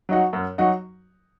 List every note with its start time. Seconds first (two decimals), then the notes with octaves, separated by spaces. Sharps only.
0.09 F#3 D#4 F#4
0.33 F#2
0.58 F#3 D#4 F#4